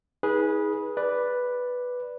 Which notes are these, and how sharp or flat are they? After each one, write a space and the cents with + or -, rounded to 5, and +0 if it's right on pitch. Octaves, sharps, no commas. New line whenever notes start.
D#4 +45 G#4 +0 B4 -20
B4 +0 D5 +0